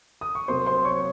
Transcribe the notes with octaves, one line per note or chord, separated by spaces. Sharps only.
D#6
C#6
C2 C3 F#3 A#3 C5 C6
C5 C6
C#5 C#6